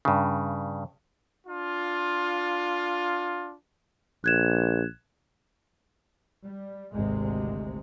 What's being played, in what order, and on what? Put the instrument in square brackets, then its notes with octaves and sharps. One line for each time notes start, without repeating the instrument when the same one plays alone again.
[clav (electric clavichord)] G2 C#3
[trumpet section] D4 F4
[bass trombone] A#1 [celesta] F#6 G#6 E7
[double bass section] G3
G#1 D2 C3 G#3